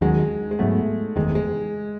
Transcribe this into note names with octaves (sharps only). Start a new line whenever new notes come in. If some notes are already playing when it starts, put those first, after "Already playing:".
D#2 D#3 F#3 G#3 C#4
G#3
G#2 F#3 A3 B3
F#1 E2 D#3 G#3
G#3